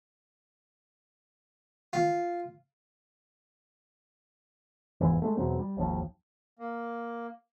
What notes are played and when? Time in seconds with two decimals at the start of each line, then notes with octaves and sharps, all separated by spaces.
1.93 F4
5.01 F1 E2 G#2 E3
5.22 G#3 A3
5.37 E2 B2 F#3 C4
5.59 G3
5.77 G#1 D#2 F3
6.59 A#3